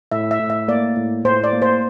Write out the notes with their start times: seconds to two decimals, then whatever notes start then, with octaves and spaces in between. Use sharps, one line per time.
0.12 A2 E5
0.31 E5
0.39 A2
0.50 E5
0.68 A#3 D5
0.97 A2
1.25 A2 C5
1.44 D5
1.53 A#3
1.62 C5